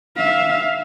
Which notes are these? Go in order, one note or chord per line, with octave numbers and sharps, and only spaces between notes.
E5 F5